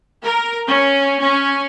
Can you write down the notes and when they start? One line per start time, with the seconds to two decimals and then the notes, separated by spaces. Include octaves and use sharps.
0.23 A#4
0.69 C#4
1.19 C#4